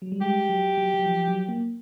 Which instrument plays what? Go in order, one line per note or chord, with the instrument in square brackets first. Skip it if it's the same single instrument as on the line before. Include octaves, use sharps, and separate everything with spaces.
[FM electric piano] F#3
G3
[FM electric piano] G#3 [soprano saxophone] G4
[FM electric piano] F#3
F#3
F#3
F3
F#3
A#3